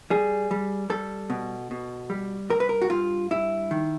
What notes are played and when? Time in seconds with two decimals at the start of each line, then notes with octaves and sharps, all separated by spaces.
0.10 G3 G#4
0.51 G3
0.90 G3 A4
1.30 B2
1.71 B2
2.10 G3
2.50 G2 A#4
2.60 B4
2.69 A#4
2.82 F#4
2.90 G2 F4
3.31 G2 E4
3.71 D#3